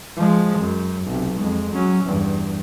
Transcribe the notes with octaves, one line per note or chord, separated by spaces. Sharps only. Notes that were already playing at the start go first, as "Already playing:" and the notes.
F3 G#3
F#2
B1 C3
F2 G#3
F#3 C#4
E2 G2